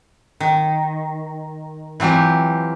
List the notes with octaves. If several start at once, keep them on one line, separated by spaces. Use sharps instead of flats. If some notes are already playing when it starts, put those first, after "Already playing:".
D#3
E3 F#3 C4 F4 G4